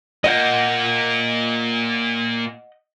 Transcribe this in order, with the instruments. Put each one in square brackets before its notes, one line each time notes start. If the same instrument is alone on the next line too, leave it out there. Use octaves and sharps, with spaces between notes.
[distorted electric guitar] A#2 A#3 [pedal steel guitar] D#5 F#5 G6